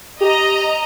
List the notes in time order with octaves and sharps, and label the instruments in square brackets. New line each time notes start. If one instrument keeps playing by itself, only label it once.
[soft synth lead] G4 [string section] D#5 A#5